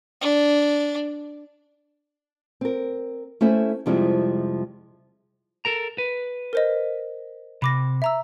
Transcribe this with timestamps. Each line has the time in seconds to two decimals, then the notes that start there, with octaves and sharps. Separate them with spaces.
0.21 D4
2.61 C4 A#4
3.41 A3 C#4 E4 A4 C5 E5
3.86 F2 C3 F3 G3 G#3 E4
5.65 A4 A#4 A#5
5.98 B4
6.53 A#4 C5 D#5
7.62 C3 B5 D6 A#6
8.02 E5 A#5 E6